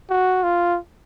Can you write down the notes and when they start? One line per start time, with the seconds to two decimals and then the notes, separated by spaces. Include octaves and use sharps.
0.10 F#4
0.43 F4